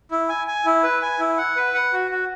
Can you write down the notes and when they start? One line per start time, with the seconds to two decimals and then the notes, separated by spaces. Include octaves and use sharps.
0.11 E4
0.29 G#5
0.47 G#5
0.66 E4
0.84 B4
1.02 G#5
1.20 E4
1.38 F#5
1.56 B4
1.74 F#5
1.93 F#4
2.11 F#4